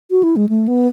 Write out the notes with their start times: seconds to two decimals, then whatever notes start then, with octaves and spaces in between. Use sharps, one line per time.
0.11 F#4
0.23 E4
0.36 G#3
0.49 A3
0.68 B3